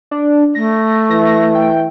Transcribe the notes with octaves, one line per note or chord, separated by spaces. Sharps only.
D4
A3 A#6
E3 A#6
G5